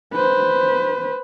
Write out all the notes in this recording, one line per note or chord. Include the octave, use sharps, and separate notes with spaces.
B4 C5